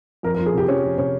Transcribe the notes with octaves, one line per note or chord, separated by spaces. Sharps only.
F2 A#4
A#4
F3
G#4
C3 G4
F3 C#4
F3
C3 C#4